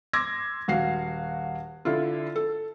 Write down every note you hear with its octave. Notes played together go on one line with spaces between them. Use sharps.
C6 D6 E6 G#6 A#6
D#1 F#4 F5 C7
D3 E4 F4
A4